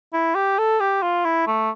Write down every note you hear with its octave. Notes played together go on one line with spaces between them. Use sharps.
E4
G4
A4
G4
F4
E4
A3